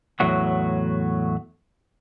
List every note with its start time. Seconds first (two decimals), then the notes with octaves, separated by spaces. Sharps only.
0.20 E2 A2 F#3 F#4